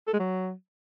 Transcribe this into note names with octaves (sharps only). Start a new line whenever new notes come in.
A4
G#3
F#3